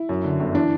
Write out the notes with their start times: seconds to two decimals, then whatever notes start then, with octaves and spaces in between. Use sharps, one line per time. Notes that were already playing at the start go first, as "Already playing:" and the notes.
Already playing: E4
0.09 F#2
0.24 D3
0.40 G1
0.55 E3 D4